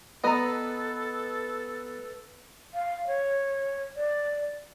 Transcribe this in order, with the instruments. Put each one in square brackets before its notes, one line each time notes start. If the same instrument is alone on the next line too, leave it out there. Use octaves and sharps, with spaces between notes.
[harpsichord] B3 [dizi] A4 [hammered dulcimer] B4 [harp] D#5 A#5
[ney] F5
C#5
D5